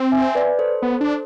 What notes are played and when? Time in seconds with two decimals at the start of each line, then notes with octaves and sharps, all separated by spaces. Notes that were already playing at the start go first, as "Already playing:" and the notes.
Already playing: C4
0.12 E5 G#5
0.35 B4 D5
0.59 A4 C5
0.82 B3
1.01 D4